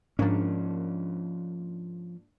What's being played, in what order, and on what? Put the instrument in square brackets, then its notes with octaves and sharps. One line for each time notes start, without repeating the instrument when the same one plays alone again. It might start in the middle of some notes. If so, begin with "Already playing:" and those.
[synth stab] G#2 A#3 D4 [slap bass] F3 C#4